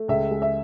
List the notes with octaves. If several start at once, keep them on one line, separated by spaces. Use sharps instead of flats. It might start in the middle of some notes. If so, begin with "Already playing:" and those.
Already playing: A3
C#2 E5
G#3
E5